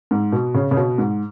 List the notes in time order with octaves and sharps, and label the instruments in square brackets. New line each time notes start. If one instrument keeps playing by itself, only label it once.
[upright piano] G#2
B2
C#3
C#3
B2
G#2